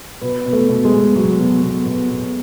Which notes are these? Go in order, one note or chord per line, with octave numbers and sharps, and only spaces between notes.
B2 B3
B2
A3
B2
G#3
B2
B2 F#3
B2
B2
B2
B2